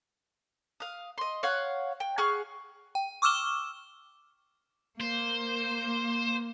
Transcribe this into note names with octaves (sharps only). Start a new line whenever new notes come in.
F5 D#6
D#5 C6
C#5 F5 F#5
G5
G#4 F#5 C#6 F6
G5
C#6 D6 E6 F6 E7 G7
A#3 C5